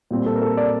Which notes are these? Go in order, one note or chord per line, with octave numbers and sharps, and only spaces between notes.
A#2 G3 C4
A4
A#4
A4
D5